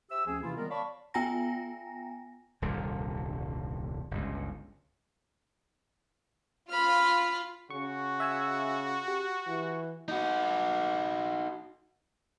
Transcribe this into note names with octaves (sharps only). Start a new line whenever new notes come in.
G4 C5 E5 E6
D2 F3 C4 C#4 G#4
C3 E3 A#3 E4 F4
D#3 G3 G#3 B3 F4 A#4
C#5 D5 F5 A5 B5 C#6
B3 F4 G5 G#5 A#5 A#6
D#1 C2 G2 D3
G1 C#2
F4 B5 F6
C#3 F#4 C#6
E5 G#5 E6
G4
E3
D#4 F#4